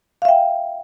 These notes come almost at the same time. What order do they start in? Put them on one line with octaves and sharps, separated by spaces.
F5 E5 G5